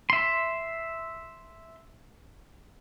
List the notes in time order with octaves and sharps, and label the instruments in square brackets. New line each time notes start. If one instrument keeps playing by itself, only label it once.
[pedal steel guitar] E5 C6